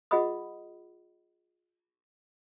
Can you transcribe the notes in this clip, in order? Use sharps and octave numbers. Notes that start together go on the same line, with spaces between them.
F4 G#4 D#5 F#5 B5 D#6